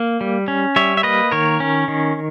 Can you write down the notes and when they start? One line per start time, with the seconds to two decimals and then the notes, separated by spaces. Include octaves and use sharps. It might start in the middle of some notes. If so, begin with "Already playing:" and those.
Already playing: A#3
0.21 G3
0.48 C#4
0.76 G3 C#5 E5
0.97 E5
1.03 A#3 B4 D#5
1.31 D#3 A#4 C#5
1.60 C#4
1.88 D#3